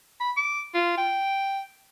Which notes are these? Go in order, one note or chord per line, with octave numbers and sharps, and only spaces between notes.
B5
D6
F4
G5